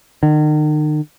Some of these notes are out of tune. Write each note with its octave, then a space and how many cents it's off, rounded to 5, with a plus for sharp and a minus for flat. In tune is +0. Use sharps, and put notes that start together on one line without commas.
D#3 -40